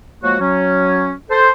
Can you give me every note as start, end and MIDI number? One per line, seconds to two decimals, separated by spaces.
0.23 0.36 53
0.23 0.36 54
0.23 0.36 56
0.23 0.36 58
0.23 0.36 66
0.40 1.11 54
0.40 1.11 61
1.29 1.48 69
1.29 1.48 72